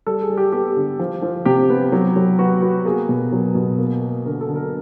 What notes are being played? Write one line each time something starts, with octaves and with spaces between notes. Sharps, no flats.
G3 A4
G#4
G3
G4
B3 G4
D3
F3
F3
C3 G4
B3
F#3
F#3
B3 F#4
B3 F#4
A#3 G#4
B2
F#3
B2
A#3
A#3
D3 A#4
A4
D3
A#4